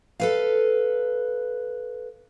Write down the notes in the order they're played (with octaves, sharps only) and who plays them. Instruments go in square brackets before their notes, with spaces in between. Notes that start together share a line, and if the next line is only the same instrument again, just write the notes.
[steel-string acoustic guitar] A4 B4 F5